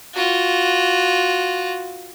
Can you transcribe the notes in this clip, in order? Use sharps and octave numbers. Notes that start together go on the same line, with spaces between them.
F4 F#4